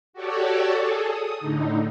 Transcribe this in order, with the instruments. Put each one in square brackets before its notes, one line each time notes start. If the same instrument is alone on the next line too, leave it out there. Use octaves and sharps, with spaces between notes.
[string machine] F#4 G4 A4 C#5 D5
G#4 A4
D#6
A2 D3 D#4